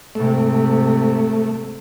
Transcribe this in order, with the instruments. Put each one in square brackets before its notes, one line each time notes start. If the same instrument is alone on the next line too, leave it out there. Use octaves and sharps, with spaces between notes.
[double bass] G#2 C3 [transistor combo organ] A3